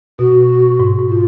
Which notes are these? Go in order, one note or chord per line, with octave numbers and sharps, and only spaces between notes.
B2 F#4
G#2
G#2
F4